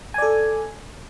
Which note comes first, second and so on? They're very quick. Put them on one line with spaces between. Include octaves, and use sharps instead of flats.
G#5 D5 A4